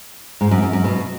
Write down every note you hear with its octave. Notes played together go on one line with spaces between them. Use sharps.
G#2
F#2
F#2
F#2
B2